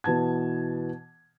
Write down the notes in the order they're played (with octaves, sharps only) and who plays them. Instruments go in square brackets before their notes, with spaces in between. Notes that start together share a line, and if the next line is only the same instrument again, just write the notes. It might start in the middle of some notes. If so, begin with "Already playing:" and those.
[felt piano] B2 E3 B3 A5 G#6